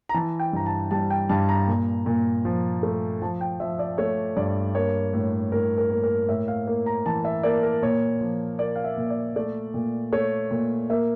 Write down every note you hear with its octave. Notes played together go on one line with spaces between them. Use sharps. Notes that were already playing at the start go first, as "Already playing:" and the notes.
A#5
E3 A5
G5
G2 A#5
A5
G3 A5
G5
G2 A5
A#5
A#2
A#2
F3
A3
F3 A5
G5
F3 E5
D5
A3 C#5
G2 D5
A#3 C#5
A2
A2 A#4
A#4
A#3
A#4
A2 E5
F5
A#3
A#5
E3 A5
E5
A#3 D5
A#4
A#2 C#5
F3
A#3 D5
F5
E5
A#2
D5
A3 D5
A#2
A3 C#5
A#2
A#3 E5